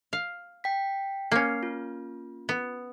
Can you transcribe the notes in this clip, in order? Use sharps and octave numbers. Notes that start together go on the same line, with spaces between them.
F5
G5 B6
A#3 C#4 C7
F4
B3